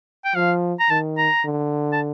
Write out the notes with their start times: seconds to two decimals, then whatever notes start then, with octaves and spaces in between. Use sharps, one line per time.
0.25 G5
0.35 F3 F5
0.80 A#5
0.90 D#3 A5
1.18 A#5
1.45 D3
1.92 A5